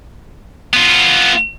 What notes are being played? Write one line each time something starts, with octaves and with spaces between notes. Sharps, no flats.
B3 F4